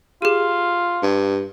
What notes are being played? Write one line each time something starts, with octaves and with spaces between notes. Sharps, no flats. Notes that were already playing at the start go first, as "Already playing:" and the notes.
F4 G4 G#4
G2